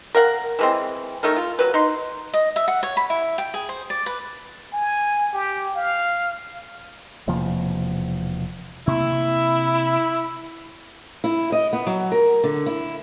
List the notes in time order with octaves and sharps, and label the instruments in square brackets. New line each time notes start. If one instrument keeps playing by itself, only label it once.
[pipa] A#4 F5 F#5
E3 G#3 C4
D#3 A3 D#4 A#4
F4
F#3 B4
D#4 C6
[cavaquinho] D#5
E5
F#5
C#5
B5
E4
G5
G#4
C5
D5
B4
[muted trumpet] G#5
G4
F5
[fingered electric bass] E1 C3 F3 A#3
[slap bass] C3 A#3 [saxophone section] E4
[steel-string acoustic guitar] E4
D#5
B3
F#3
A#4
D3
E4